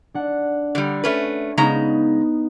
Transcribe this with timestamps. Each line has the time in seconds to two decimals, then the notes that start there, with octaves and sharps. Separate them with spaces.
0.14 D4 F#5
0.75 D3 G3
1.04 A3 C#4 B4
1.57 C#3 G#3 B3 D#4 A#5 E7